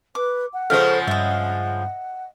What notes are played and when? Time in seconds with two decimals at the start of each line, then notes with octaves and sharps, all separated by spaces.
0.15 B4 D6
0.53 F#5
0.70 C#3 F3 G#3 A4 C5 C#5 F5
1.07 G2 D#5 E5